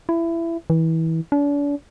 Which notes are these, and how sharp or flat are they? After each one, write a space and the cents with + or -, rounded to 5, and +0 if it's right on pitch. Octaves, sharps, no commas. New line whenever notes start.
E4 +20
E3 -25
D4 -40